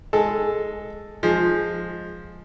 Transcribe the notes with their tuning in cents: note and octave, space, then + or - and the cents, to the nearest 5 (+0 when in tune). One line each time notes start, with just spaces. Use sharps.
G#3 +0 A4 +0
F3 +5 G#3 +0